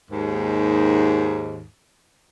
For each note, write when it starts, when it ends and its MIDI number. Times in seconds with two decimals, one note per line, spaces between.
0.11 1.65 39
0.11 1.65 44